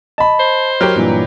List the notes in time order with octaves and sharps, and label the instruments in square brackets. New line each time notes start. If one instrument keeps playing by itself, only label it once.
[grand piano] D#5 B5 [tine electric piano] A5
[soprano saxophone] C5
[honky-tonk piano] F#3 G4 A#4 [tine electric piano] C#5 F6
[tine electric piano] G2 A#2 E3